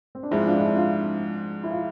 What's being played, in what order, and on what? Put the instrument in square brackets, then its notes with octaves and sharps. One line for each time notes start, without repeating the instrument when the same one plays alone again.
[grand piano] C4
D4
[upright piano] G#2 F3 G#3 [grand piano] C4 E4
[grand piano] D4 F4
D4
C4 E4
D4 F4
E4
F4